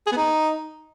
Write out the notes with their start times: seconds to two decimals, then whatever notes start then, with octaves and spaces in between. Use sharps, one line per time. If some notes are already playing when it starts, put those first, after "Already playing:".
0.06 G#4
0.11 B3
0.16 D#4